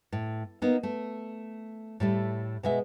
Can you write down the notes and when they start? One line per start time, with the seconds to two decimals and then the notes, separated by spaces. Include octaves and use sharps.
0.12 A2
0.62 A#3 B3 D#4
0.83 A3
2.00 A2 G3 A3
2.63 B2 G#3 E5